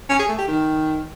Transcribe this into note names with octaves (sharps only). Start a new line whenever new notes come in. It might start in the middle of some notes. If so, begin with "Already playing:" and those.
C#4
G#4
A3
G4
D#3